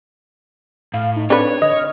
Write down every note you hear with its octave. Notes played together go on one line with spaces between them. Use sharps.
A2 F5
D#4
C4 D4 A4 B4 C#5
D3 D#5
F6